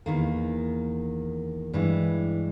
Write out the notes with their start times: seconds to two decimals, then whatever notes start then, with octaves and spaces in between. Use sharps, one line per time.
0.06 E2 D#3 A#3
1.73 G2 E3 G#3